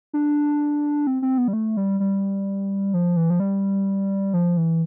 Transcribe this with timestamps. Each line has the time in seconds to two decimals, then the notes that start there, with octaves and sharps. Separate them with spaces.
0.13 D4
1.07 C4
1.22 C4
1.38 B3
1.48 G3
1.53 A3
1.77 G3
2.00 G3
2.94 F3
3.16 E3
3.30 F3
3.40 G3
4.34 F3
4.57 E3